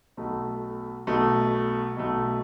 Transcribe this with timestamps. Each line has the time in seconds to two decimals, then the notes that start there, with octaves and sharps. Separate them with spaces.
0.17 B1 B2 A3
1.07 B1 B2 A3
1.96 B1 B2 A3